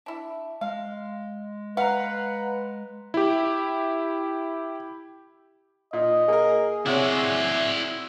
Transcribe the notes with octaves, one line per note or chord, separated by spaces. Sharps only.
D4 E4
G#3 F5
B4 F5 F#5 A#5
E4 G4
A#2 D#4 D#5
A#3 G#4 A#4
C3 E4 F#4 C#5 D5 E5